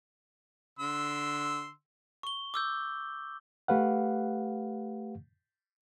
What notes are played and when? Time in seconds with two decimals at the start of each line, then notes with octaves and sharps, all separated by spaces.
0.79 D3 C6 E6
2.23 C#6 G7
2.54 D6 E6 G6
3.68 A3 G4 B4 F5 F#5